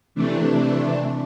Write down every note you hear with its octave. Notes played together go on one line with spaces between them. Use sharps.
C3 E3 A3 D4